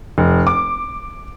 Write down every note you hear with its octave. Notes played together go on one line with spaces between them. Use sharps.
F1
D6